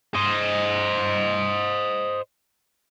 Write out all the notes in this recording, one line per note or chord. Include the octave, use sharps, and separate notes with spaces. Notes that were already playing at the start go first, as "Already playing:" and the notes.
C5 D#5